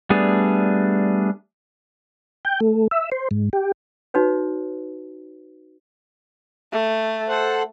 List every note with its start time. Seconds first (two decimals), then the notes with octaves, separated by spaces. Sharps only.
0.10 G3 A3 B3 D4 G#4
2.45 G5
2.60 A3
2.91 E5
3.12 C5
3.31 G#2
3.53 G4
4.14 D#4 F#4 B4 C#5
6.72 A3
7.28 A4 C5 F#5